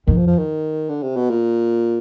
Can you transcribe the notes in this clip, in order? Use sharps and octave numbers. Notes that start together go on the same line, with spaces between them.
F2 D#3
F3
F3
D#3
D3
C3
B2
A#2